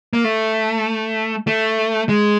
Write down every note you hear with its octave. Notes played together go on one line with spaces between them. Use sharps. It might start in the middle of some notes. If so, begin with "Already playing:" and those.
A#3
A3
A3
G#3